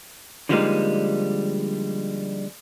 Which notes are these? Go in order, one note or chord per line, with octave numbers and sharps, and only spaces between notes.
D3 F3 G3 G#3 A#3 D#4